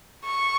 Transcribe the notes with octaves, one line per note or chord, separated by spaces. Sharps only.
C#6